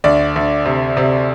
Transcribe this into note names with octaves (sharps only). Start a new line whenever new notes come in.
D2 D5
D2
C3
C3